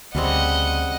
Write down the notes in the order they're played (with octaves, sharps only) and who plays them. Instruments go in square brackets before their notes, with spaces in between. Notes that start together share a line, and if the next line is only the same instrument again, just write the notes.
[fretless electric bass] D2 [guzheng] C#3 G3 C4 [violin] D#5 F#5